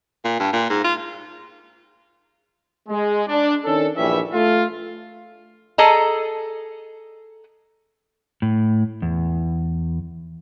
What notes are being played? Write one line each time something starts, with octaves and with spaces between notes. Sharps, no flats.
A#2
G2
A#2
G#2
F4
G#3
D4
D#3 C#4 D4 A4
A#1 G2 E3 G3 C#4 E5
A3 F4
G#4 A4 D#5 A5 A#5
A2
E2